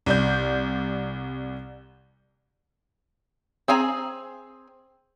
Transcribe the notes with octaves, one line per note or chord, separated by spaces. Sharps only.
C2 D5 G6
C4 G#4 G#5 A#5